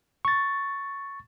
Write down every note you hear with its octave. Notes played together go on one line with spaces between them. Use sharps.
C#6 A6